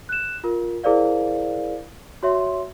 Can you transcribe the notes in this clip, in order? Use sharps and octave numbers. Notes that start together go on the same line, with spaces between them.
F#6 E7
F4 A#4
E4 G#4 A#4 C5 D5 F5
F#4 C#5 E5 C6